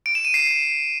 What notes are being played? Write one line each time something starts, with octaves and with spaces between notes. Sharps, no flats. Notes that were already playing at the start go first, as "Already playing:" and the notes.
D7
E7
D#7
C7